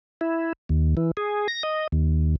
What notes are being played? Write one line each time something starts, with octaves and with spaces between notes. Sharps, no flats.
E4
D#2
E3
G#4
A#6
D#5
D#2